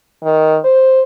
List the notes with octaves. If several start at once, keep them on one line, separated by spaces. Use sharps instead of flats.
D#3
C5